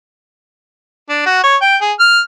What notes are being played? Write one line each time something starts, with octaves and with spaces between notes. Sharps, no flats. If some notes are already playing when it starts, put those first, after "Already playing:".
D4
F#4
C#5
G5
G#4
F6